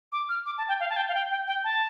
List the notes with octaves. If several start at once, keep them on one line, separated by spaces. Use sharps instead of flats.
D6
F6
D6
A5
G5
F5
A5
G5
F5
G5
G5
G5
A5